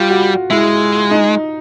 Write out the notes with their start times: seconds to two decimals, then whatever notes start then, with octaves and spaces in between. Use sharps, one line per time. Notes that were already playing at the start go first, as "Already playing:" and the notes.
Already playing: G3 F4
0.10 F#4
0.50 G#3 E4
1.11 D#4